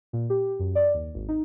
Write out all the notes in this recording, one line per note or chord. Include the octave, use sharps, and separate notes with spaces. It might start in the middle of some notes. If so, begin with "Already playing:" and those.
A#2
G4
F#2
D5
D#2
G#1
D#4